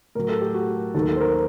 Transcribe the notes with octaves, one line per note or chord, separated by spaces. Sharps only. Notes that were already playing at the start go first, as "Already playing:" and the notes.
A2 F#3 A#4
A4
G4
F#4
D#2 D#3 F#3 A4
A#4
A4
C5
A#4